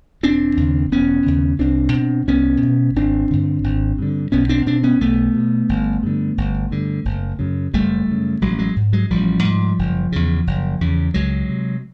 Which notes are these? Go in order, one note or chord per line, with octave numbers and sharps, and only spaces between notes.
E1 C4 D4
D#2 C#3
E1 B3 C#4
D#2 C#3
C2 C4 D4
B2
C2 B3 C#4
B2
G#1 C4 D4
G2 D3
G#1
G2 D3
B1 B3 C#4
C4 D4
B2 C4 D4
B3 C#4
B1 A3 B3
B2
G1
G2 D3
G1
G2 D3
F#1
F#2 C#3
F#1 G3 A3
F#2 C#3
A1 F#3 G#3
F#3 G#3
G#2
F#3 G#3
A1 F3 G3
G#2
F#1
E2 C#3
F#1
E2 C#3
C#2 F#3 G#3
C3